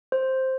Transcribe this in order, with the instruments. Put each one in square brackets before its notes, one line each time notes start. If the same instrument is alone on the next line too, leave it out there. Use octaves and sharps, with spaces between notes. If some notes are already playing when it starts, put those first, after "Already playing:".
[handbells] C5